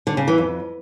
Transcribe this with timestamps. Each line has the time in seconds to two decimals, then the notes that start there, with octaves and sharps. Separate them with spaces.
0.07 D3
0.17 C#3
0.28 E3
0.38 F2